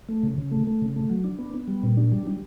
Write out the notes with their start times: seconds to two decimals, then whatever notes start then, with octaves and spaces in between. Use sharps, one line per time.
0.09 A3
0.23 C#3
0.38 C#3
0.52 A3
0.67 A3
0.82 C#3
0.96 A3
1.10 F#3
1.24 D4
1.39 B3
1.54 B3
1.68 G3
1.83 A#2
1.97 D4
2.12 G3
2.27 G3